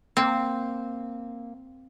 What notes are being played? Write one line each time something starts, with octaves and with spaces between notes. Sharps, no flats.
A#3 C4